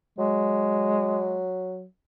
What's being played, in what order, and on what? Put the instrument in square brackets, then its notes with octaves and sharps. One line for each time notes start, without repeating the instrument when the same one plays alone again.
[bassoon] F#3 [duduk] G#3